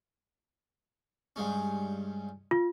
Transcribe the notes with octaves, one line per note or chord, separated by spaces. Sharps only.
G2 G#3 C#4
F4